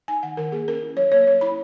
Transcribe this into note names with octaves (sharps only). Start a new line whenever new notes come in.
D#4 G#5
D#3 F#5
D#3 A#4
A#3 G#4
C#4 A#4
E4
F#3 C#5
A#3 C#5
C#4 C#5
E4 B5